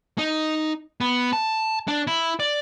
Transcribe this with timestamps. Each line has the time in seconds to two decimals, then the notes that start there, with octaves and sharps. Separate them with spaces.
0.18 D#4
1.01 B3
1.33 A5
1.88 D4
2.07 E4
2.40 D5